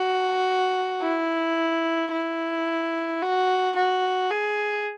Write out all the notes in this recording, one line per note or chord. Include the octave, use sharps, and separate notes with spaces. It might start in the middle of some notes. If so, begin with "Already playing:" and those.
Already playing: F#4
E4
E4
F#4
F#4
G#4